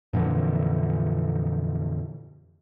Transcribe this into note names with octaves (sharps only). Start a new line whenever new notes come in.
F2 A#2 D3 E3